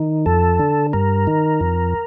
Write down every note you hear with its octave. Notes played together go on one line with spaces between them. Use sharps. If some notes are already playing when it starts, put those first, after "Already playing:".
Already playing: D#3
F2 A4
D3
G2 A#4
D#3
F2